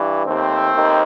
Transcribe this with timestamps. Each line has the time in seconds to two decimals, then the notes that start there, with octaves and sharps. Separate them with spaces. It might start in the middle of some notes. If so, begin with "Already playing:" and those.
Already playing: G2 E3
0.26 D#2 D#3 A3 C4
0.73 D#2 D#3